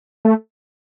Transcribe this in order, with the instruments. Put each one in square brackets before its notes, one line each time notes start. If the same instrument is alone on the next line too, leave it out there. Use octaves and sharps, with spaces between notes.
[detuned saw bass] A3